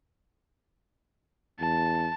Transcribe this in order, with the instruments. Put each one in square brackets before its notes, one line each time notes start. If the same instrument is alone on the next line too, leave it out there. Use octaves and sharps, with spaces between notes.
[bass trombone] E2 [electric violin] A5